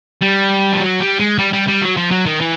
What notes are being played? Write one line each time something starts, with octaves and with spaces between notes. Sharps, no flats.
G3
F3
F#3
G3
G#3
G3
G3
G3
F#3
F3
F#3
D#3
E3